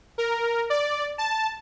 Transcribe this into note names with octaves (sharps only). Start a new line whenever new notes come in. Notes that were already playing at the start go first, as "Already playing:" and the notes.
A#4
D5
A5